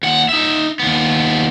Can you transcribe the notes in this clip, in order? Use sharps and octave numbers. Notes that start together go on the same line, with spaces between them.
D#2 F#5
D#4 E5
D#2 B3